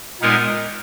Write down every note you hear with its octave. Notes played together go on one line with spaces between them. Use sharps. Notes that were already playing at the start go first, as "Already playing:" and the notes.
A#2 G#3 B3 D#4 A#4